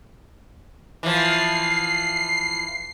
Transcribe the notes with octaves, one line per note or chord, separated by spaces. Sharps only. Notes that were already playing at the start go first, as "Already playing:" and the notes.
E3 F3 C7